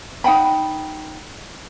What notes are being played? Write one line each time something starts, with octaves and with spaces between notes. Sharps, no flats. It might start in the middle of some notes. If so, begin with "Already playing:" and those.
D#4 F#5 G5 B5